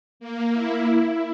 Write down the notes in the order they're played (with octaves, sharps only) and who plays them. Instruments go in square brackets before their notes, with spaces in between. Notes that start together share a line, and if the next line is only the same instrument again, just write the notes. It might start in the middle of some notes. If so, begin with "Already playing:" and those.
[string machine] A#3
E4
E4